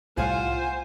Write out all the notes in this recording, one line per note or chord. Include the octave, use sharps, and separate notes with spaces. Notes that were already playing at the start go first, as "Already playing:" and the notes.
C2 A2 F4 C5 F5 F#5 G#5